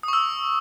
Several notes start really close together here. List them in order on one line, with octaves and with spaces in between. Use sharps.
D#6 C#6 E6